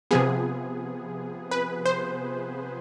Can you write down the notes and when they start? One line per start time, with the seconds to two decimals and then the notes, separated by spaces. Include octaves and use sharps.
0.11 C3 F3 B3 G#4
1.51 B4
1.86 C5